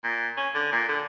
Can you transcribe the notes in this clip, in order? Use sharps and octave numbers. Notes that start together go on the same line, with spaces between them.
A#2
C#4
D3
A#2
D3